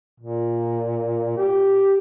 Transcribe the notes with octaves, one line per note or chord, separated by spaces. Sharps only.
A#2
G4